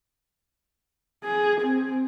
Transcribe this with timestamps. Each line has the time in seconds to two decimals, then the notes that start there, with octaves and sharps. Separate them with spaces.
1.24 G#4
1.60 C4